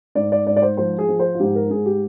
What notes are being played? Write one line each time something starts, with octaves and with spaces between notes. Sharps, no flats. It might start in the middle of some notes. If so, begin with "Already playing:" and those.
G#2 D5
D5
G#2 D5
D5
C5
F3 C5
G#4
F3
C5
F4
G#2 G4
A#4
G#2 G#4
G4